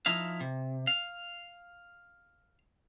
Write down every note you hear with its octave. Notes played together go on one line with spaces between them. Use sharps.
F3 D#4 E4 F5
C3
F5